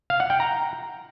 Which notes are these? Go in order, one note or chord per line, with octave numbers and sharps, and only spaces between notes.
F5
F#5
G5
A#5